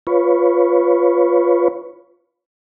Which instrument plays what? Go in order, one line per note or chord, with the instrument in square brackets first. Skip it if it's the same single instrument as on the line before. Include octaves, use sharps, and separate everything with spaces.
[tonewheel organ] F4 B4 C#5